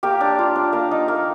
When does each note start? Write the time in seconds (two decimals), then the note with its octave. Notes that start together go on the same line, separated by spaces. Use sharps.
0.03 A#3 G4
0.21 D4
0.39 F4
0.56 D4
0.73 A#3
0.91 D#4
1.08 A#3